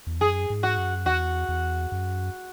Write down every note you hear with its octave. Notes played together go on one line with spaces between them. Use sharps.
E2
F#2 G#4
G#2
F#4
F#2
E2 F#4
E2
F#2